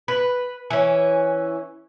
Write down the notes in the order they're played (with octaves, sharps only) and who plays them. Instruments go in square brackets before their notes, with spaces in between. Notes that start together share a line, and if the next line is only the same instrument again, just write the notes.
[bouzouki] B4
E3 C#4